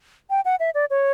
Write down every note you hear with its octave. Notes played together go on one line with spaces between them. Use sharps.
G5
F#5
E5
D5
C#5